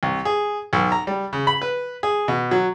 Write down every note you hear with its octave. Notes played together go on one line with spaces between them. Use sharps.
C2
G#4
B1
A#5
G3
C#3
B5
B4
G#4
B2
F#3